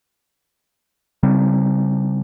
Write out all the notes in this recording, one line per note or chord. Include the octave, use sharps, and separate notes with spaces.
C#3 G3 C4